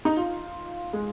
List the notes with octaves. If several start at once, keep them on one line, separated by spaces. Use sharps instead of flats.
D#4
F4
G#3